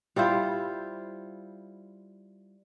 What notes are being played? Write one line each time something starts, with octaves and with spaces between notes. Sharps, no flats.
G3 E4 F4 C5